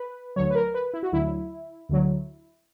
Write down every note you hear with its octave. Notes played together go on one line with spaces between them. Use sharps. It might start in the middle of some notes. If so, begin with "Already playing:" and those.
Already playing: B4
D2 D3 F#3 C#5
B4
A#4
B4
E4
F#4
D2 D3 F#3 E4
D2 D3 F#3